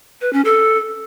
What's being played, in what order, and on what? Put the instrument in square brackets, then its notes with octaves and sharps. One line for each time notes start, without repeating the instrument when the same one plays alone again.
[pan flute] B4
C#4
A4